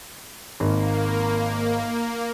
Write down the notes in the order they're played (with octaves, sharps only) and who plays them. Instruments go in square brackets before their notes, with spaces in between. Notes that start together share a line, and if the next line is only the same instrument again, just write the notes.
[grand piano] G#1 [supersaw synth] A#3